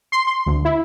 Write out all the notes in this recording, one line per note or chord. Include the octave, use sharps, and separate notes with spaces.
C6
C6
D2
E4